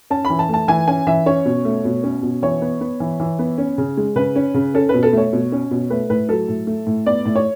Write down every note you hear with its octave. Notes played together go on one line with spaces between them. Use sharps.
C#4 A5
B5
E3
A5
A3 A5
E3 G#5
C#4 G#5
E3 E5
C#4 C#5
B2
A3
B2
C#4
B2
E3 C#5
B3
B3
E3
E3
B3
C#4
C#3
G#3
C#3 B4
C#4
C#3
C#4 A4
B2 B4
A4
A3 C#5
B2
C#4
B2
A3 B4
A2 B4
F#3 A4
A2
A3
A2
B3 D5
A2
C#5